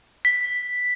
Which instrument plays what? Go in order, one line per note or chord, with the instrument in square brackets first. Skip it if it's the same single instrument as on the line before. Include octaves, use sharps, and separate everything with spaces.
[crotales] B6